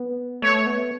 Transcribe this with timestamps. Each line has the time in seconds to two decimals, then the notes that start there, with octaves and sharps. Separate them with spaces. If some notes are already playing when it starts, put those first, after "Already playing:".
Already playing: B3
0.42 A3 C#5
0.67 B3